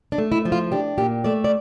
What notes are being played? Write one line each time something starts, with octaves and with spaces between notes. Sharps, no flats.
D4
A3
E4
F3
F4
D4 G4
A#2 G4
A3 D5
D5